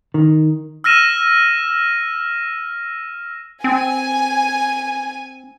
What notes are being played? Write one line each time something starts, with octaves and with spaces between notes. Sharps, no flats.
D#3
E6 F6 A#6 D#7 E7
C4 G#5